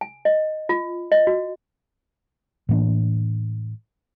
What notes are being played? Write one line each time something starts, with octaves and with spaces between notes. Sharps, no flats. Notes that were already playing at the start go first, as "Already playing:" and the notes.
G#5
D#5
F4
D#5
F#4
A2 E3 A#3 D4